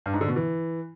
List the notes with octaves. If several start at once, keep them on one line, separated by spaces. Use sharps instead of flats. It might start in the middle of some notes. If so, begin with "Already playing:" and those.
G2
G#2
D3
B2
E3